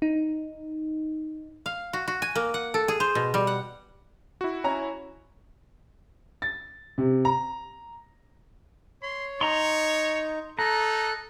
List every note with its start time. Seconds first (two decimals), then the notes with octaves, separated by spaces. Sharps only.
0.02 D#4
1.66 F5
1.93 F#4
2.08 F#4
2.22 G#5
2.35 A#3
2.54 F#5
2.74 A4
2.88 G#4
3.00 C5
3.15 B2
3.34 G3
3.47 F#5
4.41 E4 F#4
4.64 C#4 A#5
6.42 A6
6.98 C3
7.25 A#5
9.02 C#5 C6
9.41 D#4 C#5 A#5 C6
10.59 D#4 A4 A#5 F#6